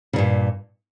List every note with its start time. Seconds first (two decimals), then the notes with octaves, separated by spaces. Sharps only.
0.13 C#3
0.16 G2
0.18 A#2